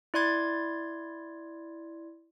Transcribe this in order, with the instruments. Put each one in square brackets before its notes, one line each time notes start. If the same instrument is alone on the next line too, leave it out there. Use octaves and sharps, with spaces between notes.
[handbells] E4 D5 C6 G#6 A6